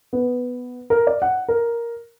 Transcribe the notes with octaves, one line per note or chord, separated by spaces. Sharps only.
B3
A#4
D5
F#5
A#4